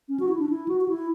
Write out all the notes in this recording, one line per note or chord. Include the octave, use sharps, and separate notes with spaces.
C#4
F#4
E4
D4
E4
F#4
F#4
E4